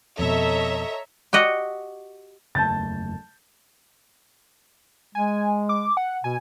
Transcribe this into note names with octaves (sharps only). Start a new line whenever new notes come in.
F2 B2 A4 C#5 D#5 E5 A#5
F#4 G4 D#5 F#5
F#1 E2 A3 A5 G6 A6
G#3 G#5
D6
F#5
B2 G#5